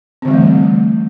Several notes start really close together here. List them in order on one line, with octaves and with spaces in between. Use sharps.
C4 D3 G3 E3 A3